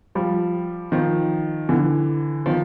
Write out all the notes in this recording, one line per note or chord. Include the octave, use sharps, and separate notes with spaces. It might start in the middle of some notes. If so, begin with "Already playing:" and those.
F3 G3
D#3 F3
D3 E3
D#3 F3